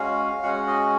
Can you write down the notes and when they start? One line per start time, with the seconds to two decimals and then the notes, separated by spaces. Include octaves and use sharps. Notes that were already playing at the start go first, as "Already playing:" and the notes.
Already playing: G#3 C#4 F#4 F5
0.43 G#3 C#4 F#4 F#5
0.67 D#5